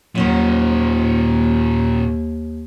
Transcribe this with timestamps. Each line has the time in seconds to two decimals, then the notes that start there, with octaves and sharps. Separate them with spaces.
0.15 D#2 A#2 D#3 F#3 C#4 C5